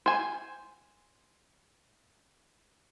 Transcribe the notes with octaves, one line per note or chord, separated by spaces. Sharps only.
C5 G#5